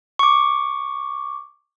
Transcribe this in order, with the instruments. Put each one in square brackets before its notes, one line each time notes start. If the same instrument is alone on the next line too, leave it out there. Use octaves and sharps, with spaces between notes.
[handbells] C#6 D6